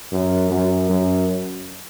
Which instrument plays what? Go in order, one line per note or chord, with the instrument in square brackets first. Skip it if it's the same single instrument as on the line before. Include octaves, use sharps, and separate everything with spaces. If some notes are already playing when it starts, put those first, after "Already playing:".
[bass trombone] F#2
F#2
F#2